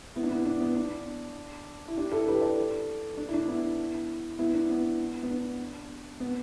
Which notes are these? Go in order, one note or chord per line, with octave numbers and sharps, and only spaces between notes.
B3 E4
D4
B3 E4
D4
B3
D4
E4
D4 G4
E4 A4
G4 B4
A4 D5
D4
E4
D4
B3 E4
B3 E4
D4
B3
B3
D4
B3